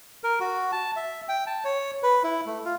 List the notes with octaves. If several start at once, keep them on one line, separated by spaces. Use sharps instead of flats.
A#4
F#4
A5
E5
G5
A5
C#5
B4
E4
A3
F4